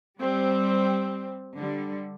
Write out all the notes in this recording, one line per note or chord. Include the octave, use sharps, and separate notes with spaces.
G3 C4
D3 G3